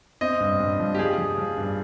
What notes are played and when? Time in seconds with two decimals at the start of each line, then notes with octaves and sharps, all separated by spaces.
0.21 C4 D#5
0.40 G2
0.60 G2
0.79 F3
0.95 G4
0.99 F3 G#4
1.18 F3
1.38 F3
1.58 G2